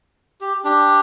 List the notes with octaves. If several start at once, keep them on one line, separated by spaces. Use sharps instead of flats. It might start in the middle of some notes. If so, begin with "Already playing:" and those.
G4
D4 G4